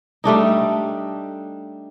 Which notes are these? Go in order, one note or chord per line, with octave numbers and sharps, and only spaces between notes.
G3 A3 D4 D#4